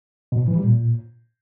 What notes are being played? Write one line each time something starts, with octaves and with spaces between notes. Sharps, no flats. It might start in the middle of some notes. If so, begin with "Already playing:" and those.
B2
A2
E3
G3
A#2